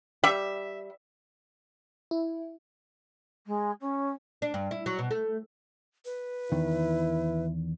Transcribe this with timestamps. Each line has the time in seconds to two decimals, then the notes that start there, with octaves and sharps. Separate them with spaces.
0.24 G3 E5
2.11 E4
3.46 G#3
3.81 C#4
4.42 D4
4.54 G2
4.71 E4
4.86 F#3
4.99 B2
5.11 A3
6.05 B4
6.52 E2 D#3 E4